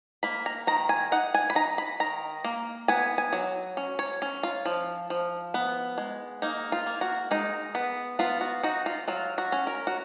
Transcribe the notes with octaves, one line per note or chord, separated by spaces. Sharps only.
A#3 B5
A#5
D#3 A#5
G#5
D#4 F#5
G#5
B5
D#4 A#5
B5
D#3 A#5
A#3
B3 G#5
G#5
F#3
C#4
C#5
C#4
F4
F3
F3
B3
G#3
A#3 D#4
F4
A#3
F#4
G#3 D#4
B3
B3 F4
F#4
D#4 F#4
F4
F#3 F4
F#4
C#4
A#4
F#4